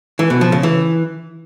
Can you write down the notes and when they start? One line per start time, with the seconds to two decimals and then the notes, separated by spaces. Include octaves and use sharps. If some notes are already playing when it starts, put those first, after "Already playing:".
0.19 E3
0.30 B2
0.41 F3
0.52 C#3
0.63 E3